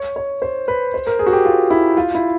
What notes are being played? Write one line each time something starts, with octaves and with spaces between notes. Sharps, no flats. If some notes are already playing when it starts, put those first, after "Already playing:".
Already playing: C#5
C#5
C5
B4
C5
A#4
G#4
F#4
G4
F4
E4
F4
E4